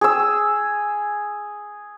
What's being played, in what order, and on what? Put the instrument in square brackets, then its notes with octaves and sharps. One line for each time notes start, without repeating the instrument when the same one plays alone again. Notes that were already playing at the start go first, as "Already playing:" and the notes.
[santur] G#4 E6